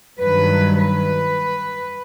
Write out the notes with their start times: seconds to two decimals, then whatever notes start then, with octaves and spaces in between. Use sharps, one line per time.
0.20 G2 D#3 F#3 B4
0.75 B4